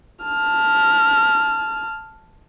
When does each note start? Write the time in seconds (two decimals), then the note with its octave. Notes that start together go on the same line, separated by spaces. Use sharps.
0.24 A5 F6